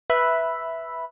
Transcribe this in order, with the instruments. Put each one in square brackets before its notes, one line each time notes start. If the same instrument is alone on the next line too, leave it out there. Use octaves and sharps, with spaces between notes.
[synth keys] B4 E5 B5